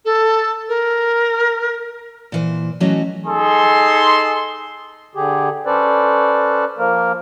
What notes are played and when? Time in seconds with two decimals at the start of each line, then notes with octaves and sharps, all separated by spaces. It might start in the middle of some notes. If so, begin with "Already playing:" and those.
0.05 A4
0.68 A#4
2.32 A#2 E3 C5
2.80 E3 F#3 A3 C#4 F#4 D#5
3.26 D#4 G#4 A4 C6
5.15 D3 G4 G#4
5.66 C#4 A4 B4 C5 D5
6.78 F3 A#3 A#4